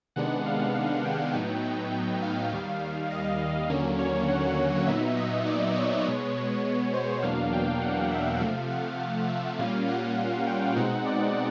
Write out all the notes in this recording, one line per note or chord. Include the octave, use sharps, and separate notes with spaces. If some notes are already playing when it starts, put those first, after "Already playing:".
C3 D#3 G#3 B3 D4 F#5
F5
F#5
G5
A2 F#3 B3 D#4
G5
F5
D#2 D#3 G3
D#5
D#2 D3 F#3 A#3 C#4
C#5
F#5
A#2 F#3 B3 D#4 E5
D#5
D5
C#5
B2 G#3 B3
C5
E2 B2 F#3 A#3 D4 F5
G5
F#5
E5
C3 F3 A3 F5
F#5
F5
E5
A#2 G3 A#3 C#4 F4 F5
F#5
G5
B2 G#3 C4 D#4 F#5
D5